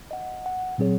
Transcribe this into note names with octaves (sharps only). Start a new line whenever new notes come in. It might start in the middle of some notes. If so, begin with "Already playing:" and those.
D#5 F#5
F#5
A#2 F#3 C4 G#4 C#5